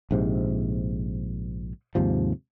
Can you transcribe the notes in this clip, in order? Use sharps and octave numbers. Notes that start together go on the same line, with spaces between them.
A#1 G#2 C3
D#2 G#2 C3 F3